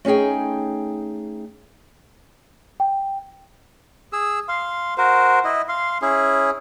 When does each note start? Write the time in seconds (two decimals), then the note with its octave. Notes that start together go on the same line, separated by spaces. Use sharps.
0.05 A3 C#4 D#4 G#4 G5
2.80 G5
4.13 G#4 E6
4.48 F5 C6
4.98 F#4 A#4 C5
5.45 E4 D#5
5.69 F5 C6
6.02 C#4 E4 G#4